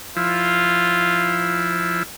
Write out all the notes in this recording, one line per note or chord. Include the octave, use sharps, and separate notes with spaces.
F3 E4 F4